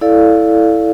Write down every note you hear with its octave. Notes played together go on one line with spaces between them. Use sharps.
E4 A4 D5 F5